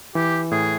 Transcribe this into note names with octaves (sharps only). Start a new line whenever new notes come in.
E3 G4
A2 G#4